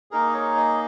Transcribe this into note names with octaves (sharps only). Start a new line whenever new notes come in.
A#3 D#4 G#4 A#4
D#5
C#5
D#5